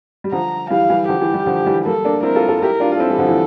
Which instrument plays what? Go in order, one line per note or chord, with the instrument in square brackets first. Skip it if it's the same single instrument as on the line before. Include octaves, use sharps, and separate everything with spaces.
[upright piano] G3
[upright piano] D3 F3 [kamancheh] A#5
[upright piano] E3 G3 [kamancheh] F5
[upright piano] E3 G3
[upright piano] D3 F3 [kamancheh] G4
[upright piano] E3
E3 G3
D3 F3
E3 G3
[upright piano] G3 A#3 [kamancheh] A4
[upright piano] A#3 D4
[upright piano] C4 E4 [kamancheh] A#4
[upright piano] F4 A4
F4 A4
[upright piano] E4 G4 [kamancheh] A#4
[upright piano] D4 F4
F4
[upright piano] C4 E4 [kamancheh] A4
[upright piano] E3 G3
D3 F3
E3